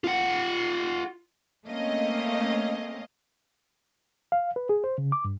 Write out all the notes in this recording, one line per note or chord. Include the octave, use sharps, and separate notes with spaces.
F4 F#5
A3 A#3 C4 C#4 D#5 F5
F5
B4
G#4
C5
C#3
D6
G2